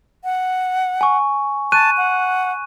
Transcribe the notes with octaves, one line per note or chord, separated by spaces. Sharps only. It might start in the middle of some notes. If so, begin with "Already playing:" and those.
F#5
G#5 C#6
A5 C#6 F#6 D#7
F#5